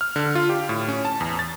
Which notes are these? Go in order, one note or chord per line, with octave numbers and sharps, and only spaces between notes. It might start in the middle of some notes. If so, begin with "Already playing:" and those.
F6
D3
F4
G4
A2
C#4
A5
E2
A6